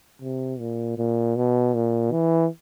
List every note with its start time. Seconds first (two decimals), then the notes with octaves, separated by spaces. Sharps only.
0.22 C3
0.60 A#2
0.98 A#2
1.36 B2
1.74 A#2
2.12 E3